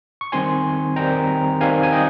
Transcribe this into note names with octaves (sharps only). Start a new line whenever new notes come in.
C#6
D#3 G3 C4 D#4 G#5 C6
D#3 G3 C4 D#4 G5 A#5
D#3 G3 C4 D#4 F5 G#5
G#5
D#5 G5